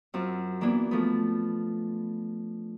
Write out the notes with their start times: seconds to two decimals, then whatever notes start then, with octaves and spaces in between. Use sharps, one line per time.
0.14 F#2 C4 F4
0.61 E3 A#3 B3 D4
0.91 F3 A3 B3